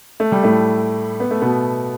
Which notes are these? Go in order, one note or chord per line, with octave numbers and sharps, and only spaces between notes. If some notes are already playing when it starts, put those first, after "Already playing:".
A3
G3
A2 A3
B3
A3
B2 B3